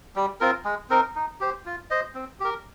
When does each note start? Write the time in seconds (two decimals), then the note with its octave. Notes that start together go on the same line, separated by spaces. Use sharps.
0.16 G3
0.40 C4 F4 A#4
0.65 G#3
0.90 C4 D#4 A#4
1.16 D#4
1.40 G4 C5
1.66 F4
1.90 C5 D#5
2.15 C4
2.40 G4 A#4